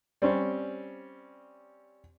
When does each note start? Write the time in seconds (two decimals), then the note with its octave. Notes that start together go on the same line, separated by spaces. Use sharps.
0.22 G3 C4 C#4